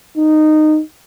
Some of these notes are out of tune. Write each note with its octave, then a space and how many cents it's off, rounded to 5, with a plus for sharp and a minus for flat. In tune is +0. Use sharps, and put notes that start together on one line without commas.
D#4 -15